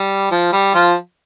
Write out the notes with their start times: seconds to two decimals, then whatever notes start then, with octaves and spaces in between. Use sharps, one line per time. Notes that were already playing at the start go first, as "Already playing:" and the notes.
Already playing: G3
0.31 F3
0.53 G3
0.74 F3 F4